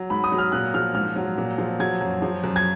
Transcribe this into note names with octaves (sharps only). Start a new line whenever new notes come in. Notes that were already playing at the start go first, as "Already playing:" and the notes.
Already playing: F#3
G#2 B5
D#6
F#3
F6
A#2 F#6
F3 F6
G#2 F6
F#3
A#2
F3
F#3 G#6
F#2
F3
F#2
G#6